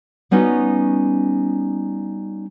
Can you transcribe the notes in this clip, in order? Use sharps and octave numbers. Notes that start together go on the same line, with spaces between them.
G3 B3 C#4 D#4 F#4